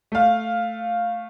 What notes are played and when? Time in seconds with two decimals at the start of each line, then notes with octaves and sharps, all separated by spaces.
0.12 A3 F5